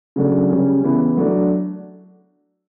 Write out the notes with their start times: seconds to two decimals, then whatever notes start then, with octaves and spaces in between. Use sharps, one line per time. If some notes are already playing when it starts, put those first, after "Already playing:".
0.16 C#3 F#3 A3 D4
0.50 C#3 G3 C#4
0.83 C#3 E3 B3 E4
1.17 F#3 A3 D4